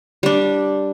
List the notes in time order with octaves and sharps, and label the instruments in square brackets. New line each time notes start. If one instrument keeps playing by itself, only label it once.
[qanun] G3 D4